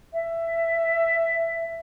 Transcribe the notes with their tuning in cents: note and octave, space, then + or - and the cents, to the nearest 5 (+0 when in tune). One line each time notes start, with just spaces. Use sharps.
E5 +15